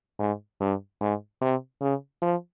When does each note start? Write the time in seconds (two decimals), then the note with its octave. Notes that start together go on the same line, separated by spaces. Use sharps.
0.19 G#2
0.61 G2
1.01 G#2
1.41 C3
1.81 C#3
2.22 F3